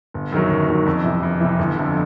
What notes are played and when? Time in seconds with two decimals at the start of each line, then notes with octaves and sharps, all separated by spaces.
0.14 G1
0.32 F#2 D#3 F#3
0.51 G1
0.68 F#2 D#3 F#3
0.86 F2
1.04 C3 E3
1.23 F2
1.40 C3 E3
1.59 G1
1.76 F2 D3